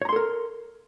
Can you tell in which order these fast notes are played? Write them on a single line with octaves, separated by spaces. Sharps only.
C#5 A#5 C6 A4 A#4